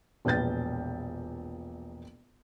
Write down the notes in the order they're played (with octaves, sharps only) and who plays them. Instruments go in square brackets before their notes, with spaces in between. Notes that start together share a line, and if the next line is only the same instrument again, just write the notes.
[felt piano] E1 A#1 B4 G6 A6